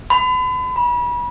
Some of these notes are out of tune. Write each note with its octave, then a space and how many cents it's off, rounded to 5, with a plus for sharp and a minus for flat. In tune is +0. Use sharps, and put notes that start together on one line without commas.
B5 +40
B5 -30